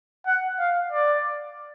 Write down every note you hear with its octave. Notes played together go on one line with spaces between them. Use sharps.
F#5
F5
D5